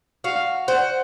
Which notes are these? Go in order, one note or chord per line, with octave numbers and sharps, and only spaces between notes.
F#4 F5
C5 F#5